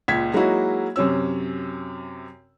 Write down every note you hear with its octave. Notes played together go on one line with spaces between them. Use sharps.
C#2 A#2 G#6 B6
F#3 G#3 A#3 D#4 E4 F#4
F#2 C3 C#4 E6